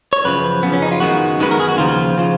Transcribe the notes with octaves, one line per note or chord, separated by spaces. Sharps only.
C#5
F#2 C#3 F3 B4
F#2 C#3 F3 B3
C#4
D#4
F4
F#2 D#3 G#3 B3 F#4
F#2 D#3 G#3 B3 B4
A#4
G#4
F#4
D#2 C#3 F3 F4
C#3 F3